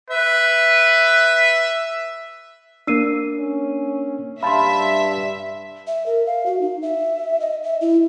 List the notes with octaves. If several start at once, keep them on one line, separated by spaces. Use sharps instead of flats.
B4 E5
A#3 D4 E6 C7 D#7
C#4
G2 E5 F5 A5 B5 C6
E5
A#4
F5
F#4
D#4
E5
D#5
E5
E4